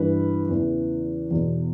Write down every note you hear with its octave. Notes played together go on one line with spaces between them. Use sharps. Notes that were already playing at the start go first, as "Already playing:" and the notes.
Already playing: G2 E3 B4
E2 C#3 E3
E2 B2